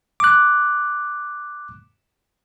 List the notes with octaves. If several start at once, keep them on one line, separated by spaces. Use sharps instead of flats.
D6 F#6